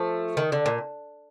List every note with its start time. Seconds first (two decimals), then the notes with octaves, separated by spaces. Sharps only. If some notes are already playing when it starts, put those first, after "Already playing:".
Already playing: F3 A3
0.37 D#3
0.52 D3
0.66 A#2